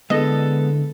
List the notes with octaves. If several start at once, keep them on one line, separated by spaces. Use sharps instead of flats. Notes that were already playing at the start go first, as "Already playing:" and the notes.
D3 G#3 B3 E4 A4 D#5